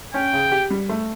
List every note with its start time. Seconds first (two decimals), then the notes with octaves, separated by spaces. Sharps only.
0.14 C#4 G5
0.33 C#3
0.52 G4
0.70 G3
0.89 A3